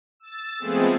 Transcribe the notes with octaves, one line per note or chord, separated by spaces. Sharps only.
E6 A6
F3 G#3 A3 B3 C4 G#4